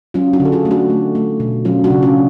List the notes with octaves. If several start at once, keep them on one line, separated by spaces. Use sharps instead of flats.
F#3 C#4 F4
D4 F#4
D3
A4
F4 G#4
A3 G#4
D4 F#4
A3
A3
B2
F#3 C#4 F4
D4 F#4
C#3
C#4 F4